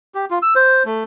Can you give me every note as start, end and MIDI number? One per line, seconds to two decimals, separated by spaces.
0.15 0.25 67
0.31 0.39 65
0.42 0.54 88
0.56 0.83 72
0.86 1.04 57